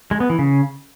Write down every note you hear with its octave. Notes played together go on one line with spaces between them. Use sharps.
G#3
B3
E3
C#3